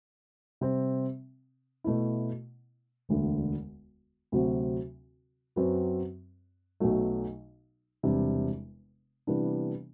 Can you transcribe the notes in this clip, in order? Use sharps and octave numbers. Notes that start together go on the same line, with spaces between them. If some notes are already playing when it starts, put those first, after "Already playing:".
C3 G3 C4
B2 A3 E4
E1 D2 D3
D2 C3 F#3 C4 F#4
F#2 F#3 C4 F#4 B4
B1 B2 F#3 A3
E1 E2 C3 G3 D4
C3 E3 G3 B3 D4